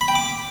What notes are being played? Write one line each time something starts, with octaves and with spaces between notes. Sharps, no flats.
B5
G5
D6